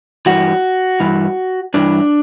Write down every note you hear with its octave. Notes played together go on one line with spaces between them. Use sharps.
G2 E3 F#4
G2 E3
G2 E3 D4